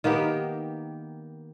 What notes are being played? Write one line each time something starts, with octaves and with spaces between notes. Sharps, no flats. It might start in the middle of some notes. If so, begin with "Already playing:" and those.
D#3 A#3 B3 G4